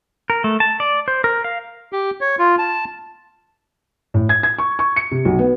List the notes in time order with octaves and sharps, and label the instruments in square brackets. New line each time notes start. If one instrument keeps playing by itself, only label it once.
[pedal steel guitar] A#4
A3
A5
D5
C5
A#4
F5
[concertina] G4
C#5
F4
A5
[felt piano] A2
G#6
G#6
C#6
C#6
C#7
C3
B1
B3